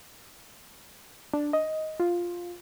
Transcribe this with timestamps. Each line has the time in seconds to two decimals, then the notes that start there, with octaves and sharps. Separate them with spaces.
1.34 D4
1.53 D#5
2.00 F4